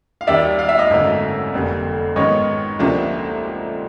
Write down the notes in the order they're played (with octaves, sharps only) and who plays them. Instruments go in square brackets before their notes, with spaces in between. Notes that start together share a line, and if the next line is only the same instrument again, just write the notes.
[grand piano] F5
[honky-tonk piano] D#2 D#3 G3 [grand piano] D5 E5
[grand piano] F5
E5
D#5 F5
[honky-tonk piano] G#1 F#2 D3 F#3 A3
F1 F2 D3 G3 A#3
[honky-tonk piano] G#2 D#3 G#3 B3 [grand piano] C#5 D#5
[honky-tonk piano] D2 C3 F3 A#3 D4